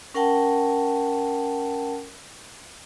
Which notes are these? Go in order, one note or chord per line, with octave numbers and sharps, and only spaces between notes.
C#4 A#4 F#5 G5 A5